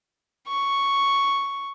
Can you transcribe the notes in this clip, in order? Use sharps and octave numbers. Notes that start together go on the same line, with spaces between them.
C#6